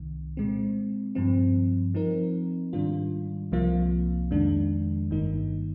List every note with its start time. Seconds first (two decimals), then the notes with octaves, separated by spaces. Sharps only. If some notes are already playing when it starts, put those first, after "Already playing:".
Already playing: C2 C3 D#3
0.37 A#2 G#3 C4
1.15 G2 F3 C4
1.94 F3 C4 D#4 A#4
2.73 G#2 D#3 G3 D4 F4
3.52 C2 C3 F3 A#3 F4
4.31 F2 D#3 G#3 D4
5.10 G1 G2 D#3 A#3 D#4